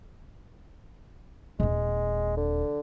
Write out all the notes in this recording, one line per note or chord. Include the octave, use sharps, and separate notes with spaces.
D#1 G#3 C4
D3